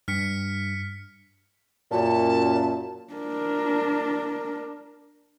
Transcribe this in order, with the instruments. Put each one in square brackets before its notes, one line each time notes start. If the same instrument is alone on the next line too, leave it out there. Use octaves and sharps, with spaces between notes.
[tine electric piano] G2 [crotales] F6 B6 C#7
[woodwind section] F#2 A#2 [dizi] A5
[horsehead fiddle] D4 A#4